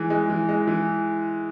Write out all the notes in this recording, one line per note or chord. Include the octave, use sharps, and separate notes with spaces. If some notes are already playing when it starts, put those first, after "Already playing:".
Already playing: E3 G#3
G#3
E3
G#3
E3